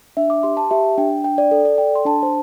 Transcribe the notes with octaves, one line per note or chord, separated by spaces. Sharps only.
D4 E5
D6
G4 C6
A5
G4 E5
D4 G5
D4 G5
D5
A4
D5
A4 G5
C6
D4 A5
C5